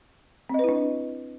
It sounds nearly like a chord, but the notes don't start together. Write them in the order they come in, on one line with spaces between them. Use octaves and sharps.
C4 D#5 B4 E4 D4